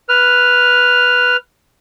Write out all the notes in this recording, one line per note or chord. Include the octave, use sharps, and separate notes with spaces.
B4 F6